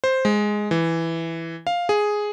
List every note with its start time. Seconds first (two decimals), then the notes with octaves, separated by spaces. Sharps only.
0.04 C5
0.25 G#3
0.71 E3
1.67 F5
1.89 G#4